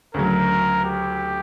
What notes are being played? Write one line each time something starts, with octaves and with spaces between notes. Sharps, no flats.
D2 C#3 F#3 A#4
G4